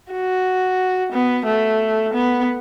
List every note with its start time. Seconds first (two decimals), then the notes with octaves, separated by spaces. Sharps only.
0.12 F#4
1.12 B3
1.46 A3
2.13 B3